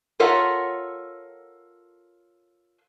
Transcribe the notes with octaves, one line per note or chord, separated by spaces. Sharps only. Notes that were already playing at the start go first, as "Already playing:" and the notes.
F4 A4 A#4 C#5 E5 F#5